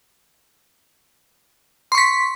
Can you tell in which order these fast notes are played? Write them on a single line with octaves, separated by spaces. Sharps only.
C6 C#6 B6